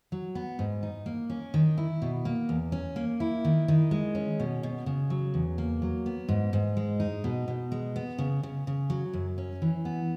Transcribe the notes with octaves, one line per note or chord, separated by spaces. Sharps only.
F#3
B3
G#2
D#4
A#3
C#4
D#3
E4
B2
A#3
E2
C#4
A#3
E4
D#3
D#3
G#3
C#4
B2
B2
C#3
F#3
E2
A#3
F#3
B3
G#2
G#2
G#3
D#4
B2
B2
G#3
B3
C#3
C#3
C#3
F#3
F#2
C#4
E3
B3